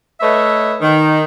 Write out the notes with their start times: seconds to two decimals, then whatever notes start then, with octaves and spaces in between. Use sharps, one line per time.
0.21 A3 B4 C#5 D#5 E5
0.81 D#3